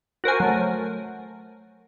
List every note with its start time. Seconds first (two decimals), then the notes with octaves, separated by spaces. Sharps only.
0.24 F#4 A#4 C5 G#5
0.40 F#3 A3